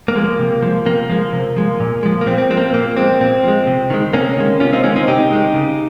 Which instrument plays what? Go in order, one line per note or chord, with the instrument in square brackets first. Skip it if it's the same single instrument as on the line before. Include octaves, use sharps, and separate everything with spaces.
[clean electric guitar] A#3
F3 G#3
C3
F3 G#3
C3 A#3
F3 G#3
C3
F3 G#3
A#2
F3 G#3
A#3
A#2 C4
C4
F3 G#3 C4
A#3
C4
A#2 A#3
F3 G#3 C4
A#2 C4
F3 G#3
C3
D#3 G#3
C3 A#3 C#4
D#3 G#3
C3 C#4 F4
C4 D#4
D#3 G#3 A#3 C#4
C4 D#4
C3 D#4 G4
D#3 G#3
C#3